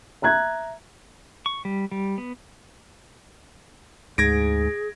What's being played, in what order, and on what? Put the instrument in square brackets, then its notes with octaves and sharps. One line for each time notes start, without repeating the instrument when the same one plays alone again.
[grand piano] E5 A#5 F#6 G#6
[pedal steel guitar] C#6
G3
G3
B3
[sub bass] D2 [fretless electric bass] G#2 [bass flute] G#4 [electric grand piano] G#6 A#6 D7